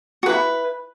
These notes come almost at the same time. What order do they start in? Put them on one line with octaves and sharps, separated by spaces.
F#4 B4 E4